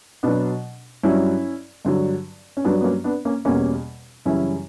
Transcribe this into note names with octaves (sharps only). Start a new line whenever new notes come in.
B2 F#3 B3 D4
G2 F#3 C#4 E4
G2 D3 F#3
C#4
G2 F#3 B3 D4
B3
A#3 C#4
B3 D4
A#3 C#4
E2 B2 G3 A#3 C#4
F#2 C#3 E3 G3 C#4 E4